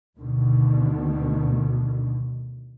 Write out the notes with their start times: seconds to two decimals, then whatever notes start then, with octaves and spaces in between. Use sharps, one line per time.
0.18 D2 B2 D3 D#3